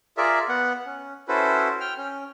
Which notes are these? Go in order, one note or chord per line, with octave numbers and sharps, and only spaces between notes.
F4 G#4 A#4 D5 E5
B3 F#5
C#4
C#4 E4 F#4 A4 B4 C5
G5 F6
C#4